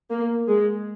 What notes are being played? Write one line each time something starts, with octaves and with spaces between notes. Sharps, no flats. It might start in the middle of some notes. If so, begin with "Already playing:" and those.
A#3
G#3